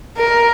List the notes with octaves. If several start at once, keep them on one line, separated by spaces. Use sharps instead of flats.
A#4